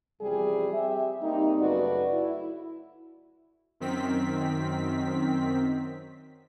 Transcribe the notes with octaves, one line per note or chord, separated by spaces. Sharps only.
E2 C3 F3 G3 G4 G#4
C4 G4 G#4 E5
G3 A#3 C4 D#4
F#2 C#3 A3 F#4 B4 D5
E4
F#2 D#3 C4 B6